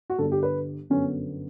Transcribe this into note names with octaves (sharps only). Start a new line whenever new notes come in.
F#4
G1 G2 D3 G3 A4
G4
B4
G1 F#2 D3 F#3 B3 C#4